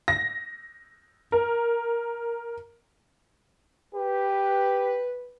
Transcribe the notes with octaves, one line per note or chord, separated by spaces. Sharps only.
A#6
A#4
G4 B4